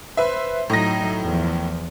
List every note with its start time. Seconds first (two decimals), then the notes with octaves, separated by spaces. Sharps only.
0.17 B4 C5 E5
0.70 A2 F#3 D#4 A#6
1.22 E2 F3